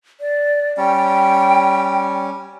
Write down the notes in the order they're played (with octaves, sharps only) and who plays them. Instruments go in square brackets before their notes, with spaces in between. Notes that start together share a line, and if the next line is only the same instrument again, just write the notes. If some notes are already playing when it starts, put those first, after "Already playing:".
[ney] D5
[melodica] G3 C#4 [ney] G5